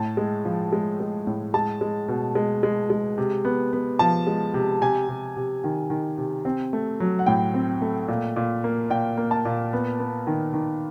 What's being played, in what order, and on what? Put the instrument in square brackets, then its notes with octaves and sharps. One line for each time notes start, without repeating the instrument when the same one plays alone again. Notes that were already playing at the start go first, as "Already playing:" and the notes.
Already playing: [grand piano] A2 A5
G#3
F3
G#3
G#3
A2
G#3 A5
G#3
B2
G#3
G#3
G#3
C3
B3
B3
F3 A5
G#3
C3
C3 G#5
C3
C3
D#3
D#3
C3
C4
A3
F#3
F#5
A2 G5
C4
A3
A#2
A#2
A#3
A#2 G5
A#3
A5
A#2
B3
B3
D#3
D#3